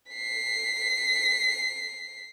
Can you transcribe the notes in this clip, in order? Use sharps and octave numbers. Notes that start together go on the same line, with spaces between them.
B6 C7